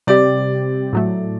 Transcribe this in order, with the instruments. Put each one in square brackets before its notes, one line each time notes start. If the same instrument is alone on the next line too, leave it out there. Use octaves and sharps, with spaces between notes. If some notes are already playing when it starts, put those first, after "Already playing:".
[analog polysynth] C3 G3 C4 G4 [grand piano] D5
[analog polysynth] A2 F#3 A3